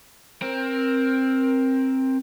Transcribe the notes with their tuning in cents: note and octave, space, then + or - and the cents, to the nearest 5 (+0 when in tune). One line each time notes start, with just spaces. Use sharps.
C4 +15 A#4 +15